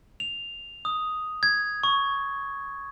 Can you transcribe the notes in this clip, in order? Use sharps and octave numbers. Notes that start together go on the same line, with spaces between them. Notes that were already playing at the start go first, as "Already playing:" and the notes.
F7
D#6
G#6
C#6